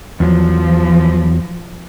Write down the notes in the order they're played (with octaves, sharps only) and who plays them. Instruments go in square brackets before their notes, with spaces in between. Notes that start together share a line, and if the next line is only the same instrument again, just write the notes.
[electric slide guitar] E2 F#3 [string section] F3